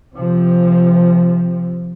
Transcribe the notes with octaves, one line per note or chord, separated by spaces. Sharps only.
C3 F3